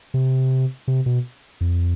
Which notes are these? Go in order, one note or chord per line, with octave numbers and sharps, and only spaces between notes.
C3
C3
B2
F2